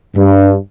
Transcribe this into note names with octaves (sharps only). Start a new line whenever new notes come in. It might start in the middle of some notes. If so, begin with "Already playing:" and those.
G2